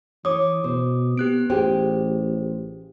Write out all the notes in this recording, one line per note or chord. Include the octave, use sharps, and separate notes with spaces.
E3 C#5 D6 D#6
B2 C5
B3 G4 F#6 D7
A1 F4 G4 G#4 C5